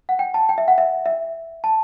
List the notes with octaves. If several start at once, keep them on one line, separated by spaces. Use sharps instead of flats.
F#5
G5
A5
G5
E5
F#5
E5
E5
A5